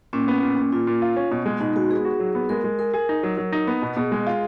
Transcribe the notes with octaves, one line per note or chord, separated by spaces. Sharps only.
A#2 C#4
B3
A#2
A#2
A#2 F4
A#2
F4
C#4
B2
G#3
B2 D#4
G#3 F#4
B3 G#4
F#4
F#3
B3
G#3 A#4
G#3
G#4 A#4
G#4
D#4
F#3
F#3
D#4
B3
B2
B2 G#4
G#3
F4